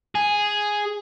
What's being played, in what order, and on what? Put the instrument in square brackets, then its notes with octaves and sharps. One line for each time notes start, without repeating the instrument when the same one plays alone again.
[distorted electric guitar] G#4